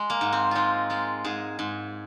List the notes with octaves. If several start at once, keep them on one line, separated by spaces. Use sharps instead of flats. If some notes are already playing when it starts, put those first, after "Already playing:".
Already playing: G#3
A#3
G#2
C4
G#3 D#4 F4
G#3 F4
G#2 G#4
G#2